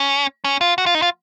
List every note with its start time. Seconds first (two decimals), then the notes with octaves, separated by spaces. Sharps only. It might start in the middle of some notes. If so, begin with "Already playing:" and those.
Already playing: C#4
0.44 C#4
0.61 F4
0.78 F#4
0.86 F4
0.95 D#4
1.02 F4